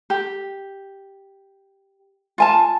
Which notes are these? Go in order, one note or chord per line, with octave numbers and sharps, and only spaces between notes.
G4
F4 G#5 A5